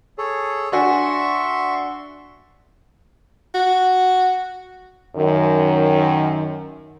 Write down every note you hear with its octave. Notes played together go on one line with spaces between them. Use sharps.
G#4 A4 C#5
D4 F#4 E5 G#5 C6 C#6
F#4
F#2 D#3